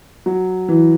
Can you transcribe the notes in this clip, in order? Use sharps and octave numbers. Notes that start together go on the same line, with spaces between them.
F#3
E3